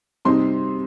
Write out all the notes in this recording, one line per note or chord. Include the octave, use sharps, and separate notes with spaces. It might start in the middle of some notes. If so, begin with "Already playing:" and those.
C3 G3 C4 D#4 C6